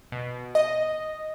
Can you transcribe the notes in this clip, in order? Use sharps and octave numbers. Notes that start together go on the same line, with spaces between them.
B2
D#5